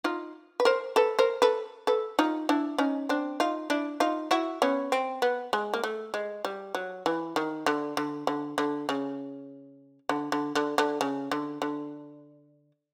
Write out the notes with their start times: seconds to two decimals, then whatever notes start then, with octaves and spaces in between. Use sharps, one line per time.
0.04 D#4 F4
0.60 B4
0.65 A#4 C5
0.96 A4 B4
1.19 A#4 C5
1.42 A4 B4
1.87 A4 B4
2.19 D#4 F4
2.49 D4 E4
2.78 C#4 D#4
3.09 C4 D4
3.40 D#4 F4
3.70 D4 E4
4.00 D#4 F4
4.31 E4 F#4
4.62 B3 C#4
4.92 C4
5.22 B3
5.53 G#3
5.74 A#3
5.84 A3
6.14 G#3
6.45 G3
6.75 F#3
7.06 E3
7.36 D#3
7.66 D3
7.97 D3
8.27 D3
8.58 D3
8.89 C#3
10.09 D3
10.32 D3
10.55 D3
10.78 D3
11.01 C#3
11.31 D3
11.62 D3